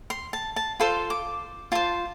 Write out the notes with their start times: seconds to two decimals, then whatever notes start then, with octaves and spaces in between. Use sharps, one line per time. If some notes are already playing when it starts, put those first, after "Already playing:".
0.10 C6
0.33 A5
0.56 A5
0.80 F4 A4 C5 C6
1.10 D6
1.72 F4 C5 A5